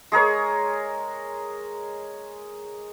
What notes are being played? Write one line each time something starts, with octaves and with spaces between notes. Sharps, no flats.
G#3 G#4 A#4 C#5